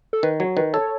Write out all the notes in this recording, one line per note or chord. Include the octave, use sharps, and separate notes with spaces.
A4
D#3 B4
F#3 C#5
D#3 B4
A4 C#5